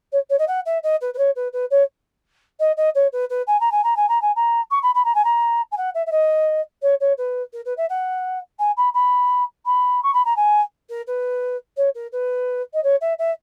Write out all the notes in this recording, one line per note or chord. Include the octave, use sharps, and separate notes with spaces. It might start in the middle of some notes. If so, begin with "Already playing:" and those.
C#5
C#5
D#5
F#5
E5
D#5
B4
B4
C#5
B4
B4
C#5
D#5
D#5
C#5
B4
B4
G#5
A#5
G#5
A#5
G#5
A#5
G#5
A#5
C#6
B5
B5
A#5
G#5
A#5
G#5
F#5
E5
E5
D#5
C#5
C#5
B4
A#4
B4
E5
F#5
G#5
B5
B5
B5
C#6
B5
A#5
G#5
A#4
B4
C#5
A#4
B4
D#5
C#5
E5
E5